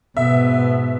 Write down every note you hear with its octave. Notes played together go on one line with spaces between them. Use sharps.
G#2 B2 B3 E5